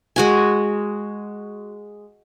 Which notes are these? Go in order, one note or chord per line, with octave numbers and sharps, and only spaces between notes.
G#3 F#4 G#5